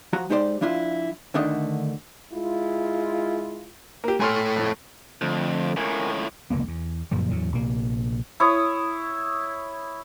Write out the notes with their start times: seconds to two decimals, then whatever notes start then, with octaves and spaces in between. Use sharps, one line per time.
0.13 F3 F#4 A#5
0.30 G#3 D#4 G4 C5 D5
0.61 F3 D4 E4 F4
1.34 D2 D3 D#3 A3 D4 D#5
2.32 G#3 E4 F4
4.04 A#3 G4
4.20 A3 C#5 G#5 C6 F6
4.56 F2 A2
5.21 F2 D3 F3 A3
5.77 C#2 A2 A#4 G#5
6.50 F1 C#2 A#3 B3
6.67 E2
7.11 G1 F#2 A#2 F3
7.31 E2 A2 F#3
7.52 A#1 C3 A#3
8.40 E4 C#5 D#6